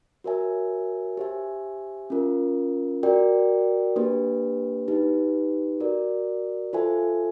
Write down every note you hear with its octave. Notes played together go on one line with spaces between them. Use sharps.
F#4 A#4 C#5 E5 G#5
G4 C5 E5 G#5
C#4 F4 A#4
F#4 A#4 D5 G5
A#3 D4 G4 B4
D#4 G4 B4
F#4 A#4 D5
F4 A4 C5 E5 G#5